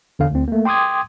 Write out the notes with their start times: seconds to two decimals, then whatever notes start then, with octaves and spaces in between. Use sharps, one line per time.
0.19 E2 D3 F5
0.31 D2 C4
0.48 A3 A#3
0.65 G5 C6 D6 D#6 G#6